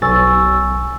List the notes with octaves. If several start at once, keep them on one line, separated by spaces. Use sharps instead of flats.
B1 G#5 C#6 E6 A6